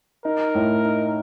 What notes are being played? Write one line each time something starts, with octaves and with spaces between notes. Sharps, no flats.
D#4 A#4
A2
D#4